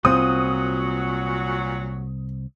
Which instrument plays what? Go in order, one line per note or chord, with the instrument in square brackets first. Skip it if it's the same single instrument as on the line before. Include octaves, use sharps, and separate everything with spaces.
[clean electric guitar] C2 [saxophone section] A#2 F#3 F#4 [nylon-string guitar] C4 F4 C5 [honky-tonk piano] D#6